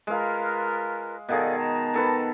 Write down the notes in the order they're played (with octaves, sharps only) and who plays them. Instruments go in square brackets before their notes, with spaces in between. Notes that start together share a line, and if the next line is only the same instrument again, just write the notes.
[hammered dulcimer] G#3 F5 [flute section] F4 A#4 B4
[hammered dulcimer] B2 D#3 G#4 [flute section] A4 D5 F5
[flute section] A5 A#5
[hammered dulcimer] D#3 A4 B4